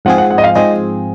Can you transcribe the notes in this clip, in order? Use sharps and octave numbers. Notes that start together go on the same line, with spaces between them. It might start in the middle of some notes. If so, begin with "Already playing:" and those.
G#2 F3 C4 F4 G#4 F#5
F#5
F#5
D#5
F5
G#2 F3 C4 F4 G#4 D#5